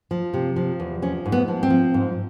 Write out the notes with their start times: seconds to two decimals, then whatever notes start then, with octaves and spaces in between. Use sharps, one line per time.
0.11 F3
0.34 C3
0.56 F3
0.80 E2
1.02 F3 C#4
1.26 G#2
1.32 B3
1.48 F3
1.63 C4
1.70 F3
1.94 G#2